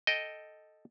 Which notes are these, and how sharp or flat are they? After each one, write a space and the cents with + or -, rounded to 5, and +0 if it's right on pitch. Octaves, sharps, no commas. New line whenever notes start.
A4 +0 D#5 +0 G5 +0